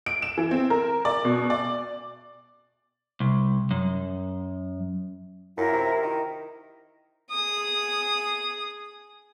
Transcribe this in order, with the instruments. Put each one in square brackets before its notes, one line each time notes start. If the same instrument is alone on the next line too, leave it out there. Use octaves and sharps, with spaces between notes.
[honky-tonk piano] D7
E7
E3
C4
A#4
D5
B2
D5
[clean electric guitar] C2
F#2
[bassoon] F#2 [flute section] E4 F4 A#4
[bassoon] C3
D#3
[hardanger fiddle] G#4 D#6